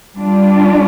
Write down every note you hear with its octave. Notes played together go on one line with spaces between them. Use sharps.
G3 D4 F4